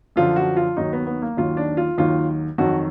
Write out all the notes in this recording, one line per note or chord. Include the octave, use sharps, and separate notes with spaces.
F#2 D3 F3 F4
F#4
F4
D#2 D#3 F#3 D#4
B3
B3
A#3
D#2 D#3 F#3 F4
D4
F4
D#2 D#3 F#3 F4
F2 D#3 F#3 F#4